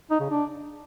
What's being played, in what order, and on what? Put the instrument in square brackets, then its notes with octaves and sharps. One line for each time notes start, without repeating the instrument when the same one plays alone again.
[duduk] D#4
C#3
D4